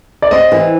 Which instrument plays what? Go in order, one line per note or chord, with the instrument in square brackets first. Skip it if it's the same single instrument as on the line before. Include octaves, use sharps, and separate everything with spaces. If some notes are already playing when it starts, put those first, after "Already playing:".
[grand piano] D5
[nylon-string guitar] C4 [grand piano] D#5
[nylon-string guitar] E3